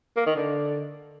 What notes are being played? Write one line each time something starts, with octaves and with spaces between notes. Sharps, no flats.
A#3
D#3
D3